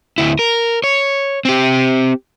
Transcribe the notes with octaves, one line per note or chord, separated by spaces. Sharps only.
D2 E4
A#4
C#5
C4 G4